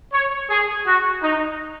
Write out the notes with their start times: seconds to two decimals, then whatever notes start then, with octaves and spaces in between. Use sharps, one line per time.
0.13 C#5
0.50 G#4
0.86 F#4
1.23 D#4